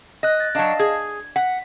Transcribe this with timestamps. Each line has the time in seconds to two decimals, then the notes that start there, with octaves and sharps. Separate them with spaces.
0.23 D#5 F#6 A#6
0.40 A6
0.55 F#3 D4 D#5 F5 A5
0.79 G#4 G#6
1.36 F#5 B6